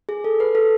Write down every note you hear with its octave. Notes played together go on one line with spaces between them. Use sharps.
G#4
A4
B4
A4